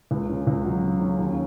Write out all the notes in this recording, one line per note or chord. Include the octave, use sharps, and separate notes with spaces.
C#2
C#4
C#2
F#3
C#3
C#4
D#2